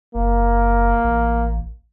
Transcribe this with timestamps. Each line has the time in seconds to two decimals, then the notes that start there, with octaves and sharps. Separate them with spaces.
0.15 F#1 A#3
1.04 A1